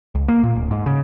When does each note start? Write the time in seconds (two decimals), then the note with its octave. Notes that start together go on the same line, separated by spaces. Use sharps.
0.15 C#2
0.28 A#3
0.44 A#2
0.55 D1
0.71 G#2
0.86 C#3